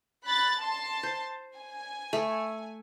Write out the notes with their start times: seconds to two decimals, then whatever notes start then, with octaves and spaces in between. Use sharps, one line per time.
0.25 B5 F#6 A6
0.59 A5 C6
1.03 C5
1.57 G#5
2.13 A3